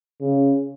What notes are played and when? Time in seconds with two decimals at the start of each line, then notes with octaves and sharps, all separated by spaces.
0.21 C#3